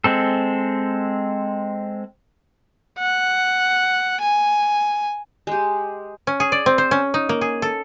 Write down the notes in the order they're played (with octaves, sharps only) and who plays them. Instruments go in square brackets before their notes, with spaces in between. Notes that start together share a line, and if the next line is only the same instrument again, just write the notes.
[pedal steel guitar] G#3 C4 A4
[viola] F#5
G#5
[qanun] G#3 G4
[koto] C#4
G#4
D5
C4
C5
C#4
D#4
A#3
G#4
A4